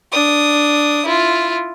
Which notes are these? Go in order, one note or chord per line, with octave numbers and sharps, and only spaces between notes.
D4 D#6
E4 F4